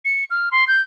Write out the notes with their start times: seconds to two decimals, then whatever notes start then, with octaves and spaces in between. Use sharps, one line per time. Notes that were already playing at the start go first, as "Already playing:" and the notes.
0.05 C#7
0.30 F6
0.51 C6
0.68 G6